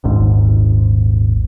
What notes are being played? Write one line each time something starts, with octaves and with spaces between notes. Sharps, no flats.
D#1 G#1 G#2